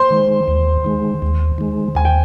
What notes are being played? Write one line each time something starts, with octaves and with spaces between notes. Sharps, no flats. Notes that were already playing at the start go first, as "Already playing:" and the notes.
Already playing: C5 C6
D#3 G#3
D#2
D#3 G#3
D#2
D#3 G#3
D#2 G#5
G5